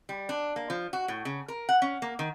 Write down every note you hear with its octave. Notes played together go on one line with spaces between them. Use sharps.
G3
D4
A#3
F3
F#4
A2
C#3
A#4
F#5
C#4
A#3
D#3